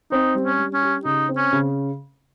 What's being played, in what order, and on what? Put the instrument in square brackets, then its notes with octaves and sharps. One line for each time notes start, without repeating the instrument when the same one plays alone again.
[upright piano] C4 [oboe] D#4
[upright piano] G3
[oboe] C#4
[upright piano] G3
[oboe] C#4
[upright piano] G4
[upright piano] C#3 [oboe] D#4
[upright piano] C4
[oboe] C#4
[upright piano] C#3